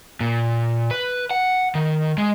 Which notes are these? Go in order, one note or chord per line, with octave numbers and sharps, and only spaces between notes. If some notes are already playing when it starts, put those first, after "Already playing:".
A#2
B4
F#5
D#3
G#3